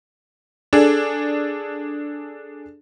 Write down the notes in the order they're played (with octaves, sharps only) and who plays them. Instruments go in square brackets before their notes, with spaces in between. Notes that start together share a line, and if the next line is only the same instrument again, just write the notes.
[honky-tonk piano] D4 G#4 A4